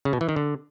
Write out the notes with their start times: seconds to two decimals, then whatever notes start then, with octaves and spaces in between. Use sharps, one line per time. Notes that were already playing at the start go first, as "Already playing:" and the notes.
0.05 C#3
0.13 B2
0.21 E3
0.29 D#3
0.36 D3